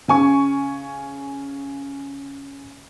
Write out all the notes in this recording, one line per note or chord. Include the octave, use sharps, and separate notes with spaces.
C#3 G#5 C#6